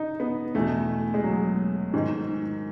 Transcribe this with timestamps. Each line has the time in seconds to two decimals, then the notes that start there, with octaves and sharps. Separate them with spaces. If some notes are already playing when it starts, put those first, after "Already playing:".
Already playing: D#4
0.20 B3
0.55 E2 B2 A3
1.14 G#3
1.24 F#3
1.94 G#2 D#3